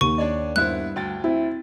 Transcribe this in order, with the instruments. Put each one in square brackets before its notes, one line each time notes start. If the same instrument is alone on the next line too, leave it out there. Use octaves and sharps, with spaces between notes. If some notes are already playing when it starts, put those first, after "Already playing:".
[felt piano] D#2 [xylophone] C#6 [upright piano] D#7
[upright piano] D4 C#5 D5
[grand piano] G2 C5 [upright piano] B3 E4 [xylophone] F#6
[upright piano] D2 G5 A6
[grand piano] C4 [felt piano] E4